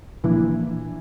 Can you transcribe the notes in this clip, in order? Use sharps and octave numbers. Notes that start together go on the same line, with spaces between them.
A#2 E3 F3 A#3 D4 E4